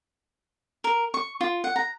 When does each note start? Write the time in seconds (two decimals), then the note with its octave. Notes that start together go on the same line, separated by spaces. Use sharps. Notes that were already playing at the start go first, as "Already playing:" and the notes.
0.84 A#4
1.14 C#6
1.41 F4
1.64 F#5
1.76 A#5